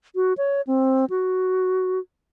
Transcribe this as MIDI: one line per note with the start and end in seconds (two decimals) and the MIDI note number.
0.16 0.33 66
0.38 0.61 73
0.67 1.05 60
1.10 1.99 66